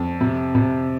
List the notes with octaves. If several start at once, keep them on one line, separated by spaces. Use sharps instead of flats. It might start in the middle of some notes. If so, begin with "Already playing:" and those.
Already playing: F2
C3
C3